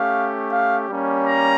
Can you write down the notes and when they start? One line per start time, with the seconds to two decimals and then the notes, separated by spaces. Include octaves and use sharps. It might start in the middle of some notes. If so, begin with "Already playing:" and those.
Already playing: A3 C#4 G4 F5
0.52 F5
0.89 G3 A#3 C#4
1.27 A#5